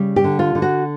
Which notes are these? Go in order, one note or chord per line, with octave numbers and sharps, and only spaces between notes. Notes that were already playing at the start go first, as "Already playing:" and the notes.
Already playing: C#3 G3
G4
D3
F4
D3
F#4